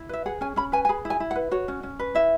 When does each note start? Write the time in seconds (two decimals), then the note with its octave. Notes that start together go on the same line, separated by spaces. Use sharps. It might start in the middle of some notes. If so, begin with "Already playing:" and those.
Already playing: E4
0.09 B4 E5
0.26 G#4 F#5
0.41 C#4 G#5
0.56 C#4 B5
0.72 B4 G#5
0.85 G#5
0.89 G#4 B5
1.05 E4
1.10 G#5
1.20 E4
1.31 F#5
1.35 B4
1.51 F#4 C#5
1.68 C#4
1.83 C#4
1.99 B4
2.15 E4 E5